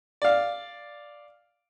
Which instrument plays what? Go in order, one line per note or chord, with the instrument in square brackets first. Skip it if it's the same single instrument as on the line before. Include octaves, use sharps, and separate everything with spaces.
[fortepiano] D5 F5